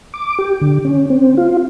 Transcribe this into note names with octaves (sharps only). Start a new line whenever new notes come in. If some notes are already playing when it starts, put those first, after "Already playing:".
D6
G4
D3
C#4
C4
F4